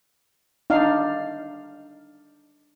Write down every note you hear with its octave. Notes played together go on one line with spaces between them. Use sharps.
D4 D#4 F5